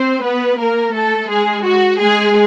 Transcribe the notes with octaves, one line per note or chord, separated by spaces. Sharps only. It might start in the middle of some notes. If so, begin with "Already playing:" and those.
Already playing: C4 C5
B3 B4
A#3 A#4
A3 A4
G#3 G#4
F#4
G#3 G#4